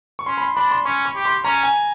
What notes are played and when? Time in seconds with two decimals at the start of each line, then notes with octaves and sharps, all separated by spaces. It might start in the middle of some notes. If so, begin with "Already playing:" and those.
0.19 C#6
0.26 C#4 C6
0.38 B5
0.42 C6
0.56 D4 B5
0.71 C6
0.85 C#4 C#6
1.06 C#6
1.16 G4
1.25 C6
1.45 C#4 A#5
1.63 G#5